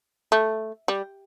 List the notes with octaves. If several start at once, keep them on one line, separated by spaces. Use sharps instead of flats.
A3
G3